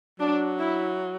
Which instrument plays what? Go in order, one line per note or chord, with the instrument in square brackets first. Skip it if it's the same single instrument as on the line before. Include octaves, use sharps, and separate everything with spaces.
[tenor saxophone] F#3 [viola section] D4
[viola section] E4